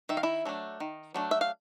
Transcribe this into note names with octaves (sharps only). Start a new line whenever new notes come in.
D#3 E5
F5
E4 E5
F#3 A3 D4
D#3
F#3 A3 D4
E5
F5